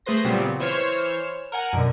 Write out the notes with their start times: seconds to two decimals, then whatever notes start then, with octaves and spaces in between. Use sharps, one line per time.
0.06 A3 G#4 B4 C5 A#6
0.24 A#2 C#3 F#3 G3 B3 C4
0.60 E3 C5 C#5 F6 G#6 E7
1.52 A#4 F#5 G#5
1.73 F#2 B2 D3